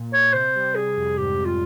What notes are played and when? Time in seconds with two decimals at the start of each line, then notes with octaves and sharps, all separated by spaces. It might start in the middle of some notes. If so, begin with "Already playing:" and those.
Already playing: A#2
0.13 C#5
0.33 C3 C5
0.55 G3
0.75 G#4
0.96 F2
1.17 G#2 G4
1.46 F4